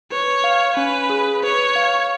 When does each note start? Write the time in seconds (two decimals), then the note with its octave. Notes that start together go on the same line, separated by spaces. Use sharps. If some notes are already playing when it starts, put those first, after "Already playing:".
0.12 B4 C#5
0.44 F5
0.77 C#4 B4
1.10 G#4
1.43 B4 C#5
1.76 F5